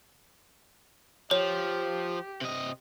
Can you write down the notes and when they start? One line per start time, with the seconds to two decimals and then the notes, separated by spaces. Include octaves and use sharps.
1.31 F3 G4 C#5
2.41 C3 D#5